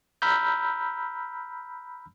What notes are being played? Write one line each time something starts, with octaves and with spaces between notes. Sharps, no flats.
A#5 B5 E6 F6 G6